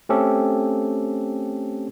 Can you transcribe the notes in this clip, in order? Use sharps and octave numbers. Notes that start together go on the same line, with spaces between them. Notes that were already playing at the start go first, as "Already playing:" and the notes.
A3 C4 C#4 G4 A4